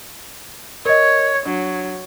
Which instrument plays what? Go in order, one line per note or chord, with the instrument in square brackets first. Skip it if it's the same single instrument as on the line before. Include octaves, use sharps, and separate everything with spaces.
[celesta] A#4 D#5 [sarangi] C#5
[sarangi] F#3 [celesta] D4